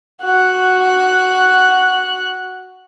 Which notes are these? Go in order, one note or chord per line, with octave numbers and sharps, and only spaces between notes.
F#4 F#6